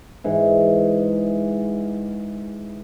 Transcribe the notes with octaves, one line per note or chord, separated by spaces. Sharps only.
G#2 E3